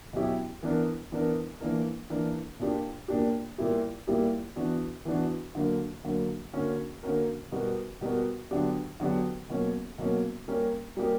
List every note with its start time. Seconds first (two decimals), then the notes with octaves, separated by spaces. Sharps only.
0.13 B2 F#3 C#4 E4 G4
0.63 E3 B3 D4 A#4
1.12 E3 B3 D4 A#4
1.61 E3 A#3 D4 A#4
2.10 E3 A#3 D4 A#4
2.59 A#2 A#3 D4 G4
3.08 A#2 A#3 D4 G4
3.58 A#2 G3 A#3 E4 G4
4.07 A#2 G3 A#3 E4 G4
4.56 E3 B3 D4 F#4
5.05 E3 B3 D4 F#4
5.55 D3 F#3 A#3
6.04 D3 F#3 A#3
6.53 D3 A#3 C#4 F#4 A#4
7.03 D3 A#3 C#4 F#4 A#4
7.52 B2 G3 B3 F#4 A#4
8.01 B2 G3 B3 F#4 A#4
8.51 D3 F#3 B3 D4 G4
9.00 D3 F#3 B3 D4 G4
9.49 B2 F#3 A#3 C#4
9.98 B2 F#3 A#3 C#4
10.48 G3 A#3 C#4 G4 A#4
10.97 G3 A#3 C#4 G4 A#4